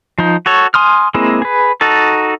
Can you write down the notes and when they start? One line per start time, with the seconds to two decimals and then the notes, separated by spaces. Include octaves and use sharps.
0.18 F3 D#4
0.46 F#4 A4 C#5
0.74 G#5 C6 D#6 F6
1.14 G#3 A#3 C4 E4 G#4
1.42 G#4 B4
1.81 D#4 F#4 A4 A5